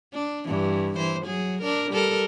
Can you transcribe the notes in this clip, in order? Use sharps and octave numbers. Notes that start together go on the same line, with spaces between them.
D4
G2 E3
E3 C5
F#3 G#4
D4 A#4
G3 A4 A#4